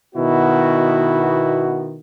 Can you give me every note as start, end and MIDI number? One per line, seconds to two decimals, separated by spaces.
0.15 1.99 47
0.15 1.99 51
0.15 1.99 59
0.15 1.99 64
0.15 1.99 66